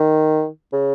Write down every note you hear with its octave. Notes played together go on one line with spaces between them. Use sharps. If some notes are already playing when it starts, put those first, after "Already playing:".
Already playing: D#3
C#3